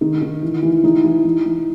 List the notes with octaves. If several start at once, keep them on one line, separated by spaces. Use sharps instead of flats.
D#3 D#4
D#3
E3
E3
E3 D#4
E3
E3
E3